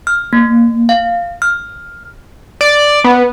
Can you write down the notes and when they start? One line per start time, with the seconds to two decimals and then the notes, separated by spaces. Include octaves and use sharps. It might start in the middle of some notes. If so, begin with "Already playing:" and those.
0.07 F6
0.33 A#3
0.89 F5
1.42 F6
2.61 D5
3.04 B3